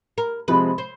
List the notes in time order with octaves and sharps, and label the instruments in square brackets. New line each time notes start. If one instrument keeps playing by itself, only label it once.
[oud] A#4
[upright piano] C3 F3 G#3 C4 [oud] B4
[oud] C5